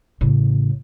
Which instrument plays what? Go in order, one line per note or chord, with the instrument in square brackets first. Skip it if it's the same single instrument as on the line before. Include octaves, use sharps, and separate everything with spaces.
[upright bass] A1 C#3